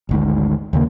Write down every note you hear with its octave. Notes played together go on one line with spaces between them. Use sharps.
G#1 D2 G#2
D#2 C#3 A#3